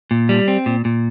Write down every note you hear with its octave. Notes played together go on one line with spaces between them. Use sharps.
A#2
G3
C4
A#2
A#2